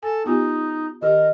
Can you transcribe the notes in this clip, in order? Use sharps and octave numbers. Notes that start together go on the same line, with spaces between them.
A4 G#5
B3 D#4 F4 G4
D#3 G4 A#4 D#5